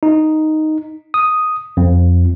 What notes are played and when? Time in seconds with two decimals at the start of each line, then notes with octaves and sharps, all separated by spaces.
0.03 D#4
1.14 D#6
1.77 F2